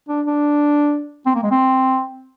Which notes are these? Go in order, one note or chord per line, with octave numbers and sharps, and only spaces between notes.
D4
D4
C4
A#3
G#3
C4